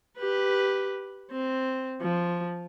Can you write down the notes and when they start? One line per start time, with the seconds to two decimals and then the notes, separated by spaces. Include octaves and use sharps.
0.18 G4 B4
1.32 C4
2.02 F3